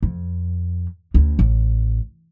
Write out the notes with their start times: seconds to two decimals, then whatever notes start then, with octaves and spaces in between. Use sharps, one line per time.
0.03 F2
1.14 D2 C#4
1.39 A1